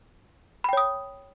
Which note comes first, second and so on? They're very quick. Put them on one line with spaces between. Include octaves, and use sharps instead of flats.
B5 G5 C#5 D#6